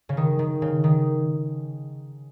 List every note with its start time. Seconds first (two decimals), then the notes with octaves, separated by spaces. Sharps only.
0.09 C#3
0.17 D#3
0.39 D#3
0.62 C#3
0.84 D#3